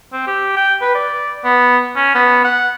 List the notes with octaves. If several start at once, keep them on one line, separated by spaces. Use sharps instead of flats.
C4
G4
G5
B4
D5
B3
C#4
B3
F#5